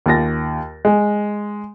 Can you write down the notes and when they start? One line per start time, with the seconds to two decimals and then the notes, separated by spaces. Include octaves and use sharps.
0.06 D#2 F4 A6 A#6
0.85 G#3